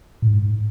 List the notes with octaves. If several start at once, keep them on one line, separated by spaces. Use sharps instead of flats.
A2
G#2